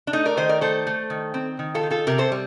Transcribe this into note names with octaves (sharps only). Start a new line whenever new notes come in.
D4
A3 D#4
A#4 D5
D#3 C5 D#5
A#4 D5
A3 A4 C5
A3
D#3
C4
D#3
F4 A4
D#3
F4 A4
C3 G4 A#4
A4 C5
G3